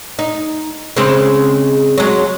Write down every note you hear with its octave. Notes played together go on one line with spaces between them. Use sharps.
D#4
C#3 G#3 C4
F#3 G#3